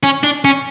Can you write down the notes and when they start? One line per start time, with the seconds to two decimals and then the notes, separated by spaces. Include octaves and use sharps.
0.03 C#4
0.23 D4
0.45 C#4